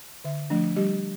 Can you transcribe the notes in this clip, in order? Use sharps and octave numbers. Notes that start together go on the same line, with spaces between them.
D3 E5
F3 A3 D4
G3 G4